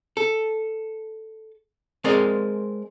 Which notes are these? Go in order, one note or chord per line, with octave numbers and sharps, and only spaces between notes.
A4
G#3 C4 A#4 D5 D#5